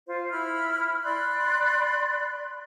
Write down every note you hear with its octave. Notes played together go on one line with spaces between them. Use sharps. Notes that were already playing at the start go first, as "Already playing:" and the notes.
F4 C5
E4 B5 F6
D5 B5 C6 F#6